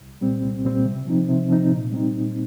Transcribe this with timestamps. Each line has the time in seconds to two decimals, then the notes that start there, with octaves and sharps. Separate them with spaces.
0.01 C2
0.21 A#2 G3 C4
0.43 C2
0.65 A#2 G3 C4
0.85 C3
1.07 F3 C4 D#4
1.28 C3
1.50 F3 C4 D#4
1.71 A#2
1.92 G3 C4 D#4
2.14 A#2